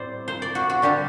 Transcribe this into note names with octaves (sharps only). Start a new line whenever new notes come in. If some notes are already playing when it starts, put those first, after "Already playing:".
Already playing: A2 G3 C4 C5 D5
C5
D5
F#4
F#4
D3 G3 D4 G4